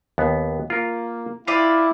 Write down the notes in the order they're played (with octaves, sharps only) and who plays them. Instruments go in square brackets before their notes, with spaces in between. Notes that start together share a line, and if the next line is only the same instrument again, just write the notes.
[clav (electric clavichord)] D#2 B3
[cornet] A#3 [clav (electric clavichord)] F4 A#4
[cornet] E4 [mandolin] F4 G4 D5 [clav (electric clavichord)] F5